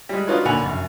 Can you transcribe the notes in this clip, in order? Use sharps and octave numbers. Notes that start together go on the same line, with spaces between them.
G3 G#3
D4 D#4 F4 F#4 B4 C#5
A#2 D3 F#5 G#5 B5 F7
F1 F#2